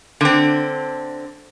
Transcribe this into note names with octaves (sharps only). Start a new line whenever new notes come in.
D3 C4